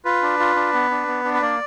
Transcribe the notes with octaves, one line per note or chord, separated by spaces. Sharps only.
F4 B4
D4
F4
D4
B3
D4
B3
D4
B4
A#3 D5